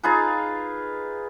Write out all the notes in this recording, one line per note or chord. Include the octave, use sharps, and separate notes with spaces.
D#4 F4 G#4 B4